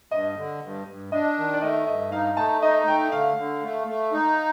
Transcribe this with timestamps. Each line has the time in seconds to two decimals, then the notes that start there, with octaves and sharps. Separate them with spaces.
0.11 G2 D#5
0.37 D3
0.63 G2
0.87 G2
1.12 D4 D#5
1.38 D#3
1.54 D5
1.62 A3 D#5
1.87 G2 D#5
2.12 D#4 F5
2.37 A3 A5
2.62 D#4 D#5
2.87 A3 G5
3.12 D3 F5
3.38 D3
3.63 A3
3.87 A3
4.13 D#4